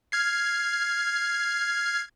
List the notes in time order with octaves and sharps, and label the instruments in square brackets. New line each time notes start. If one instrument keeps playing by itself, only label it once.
[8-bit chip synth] F6 G#6 C7